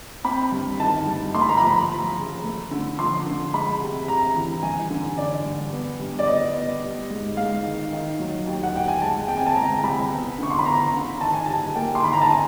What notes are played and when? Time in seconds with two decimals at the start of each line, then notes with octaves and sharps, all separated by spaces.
0.24 C4 B5
0.52 G2
0.80 D#3 A5
1.07 G2
1.34 A3 C6
1.41 B5
1.49 A#5
1.57 F3 B5
1.89 F3
2.16 C#3
2.44 A3
2.71 D3
2.98 F3 C6
3.26 D3
3.53 G#3 B5
3.81 C3
4.08 C3 A#5
4.36 E3
4.62 G2 G#5
4.90 D3
5.18 D3 D5
5.45 G2
5.72 B3
6.00 G2
6.19 D5
6.27 B3 D#5
6.54 B3
6.83 G3
7.10 G#2
7.37 G#2 F5
7.65 D#3
7.92 D#3
8.20 F#3
8.46 D#2
8.63 F#5
8.74 D#2 G5
8.88 G#5
9.02 G#3 A5
9.28 C4 G5
9.38 G#5
9.47 A5
9.56 G#3 A#5
9.84 C2 B5
10.11 B3
10.38 D3 C#6
10.50 C6
10.59 B5
10.65 B3 A#5
10.93 D3
11.21 D#3 A5
11.33 G#5
11.46 G3 A5
11.75 A#3 G5
11.95 C6
12.02 D#3 B5
12.13 A#5
12.22 A5
12.31 G#5